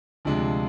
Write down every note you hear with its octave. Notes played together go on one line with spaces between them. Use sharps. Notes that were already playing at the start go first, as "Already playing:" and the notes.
D2 C3 F3 G#3 D4